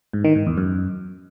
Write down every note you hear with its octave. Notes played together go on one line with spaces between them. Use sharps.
G#2
D#3
G#2
E2
F#2